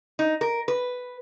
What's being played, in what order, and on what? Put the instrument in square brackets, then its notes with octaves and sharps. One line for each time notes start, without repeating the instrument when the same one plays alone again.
[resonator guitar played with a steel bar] D#4
A#4
B4